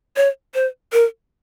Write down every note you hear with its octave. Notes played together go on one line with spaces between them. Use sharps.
C#5
C5
A#4